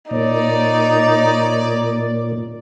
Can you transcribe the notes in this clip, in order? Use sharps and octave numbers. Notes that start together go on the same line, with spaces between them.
A#2 D#4 C#5 D5